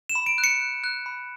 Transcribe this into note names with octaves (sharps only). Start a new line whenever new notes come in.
E7
B5
D7
F#6
C#7
F#6
F#6
B5